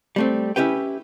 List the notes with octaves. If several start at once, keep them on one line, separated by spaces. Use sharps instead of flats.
G3 A3 C4
C#4 E4 G4 B4 G5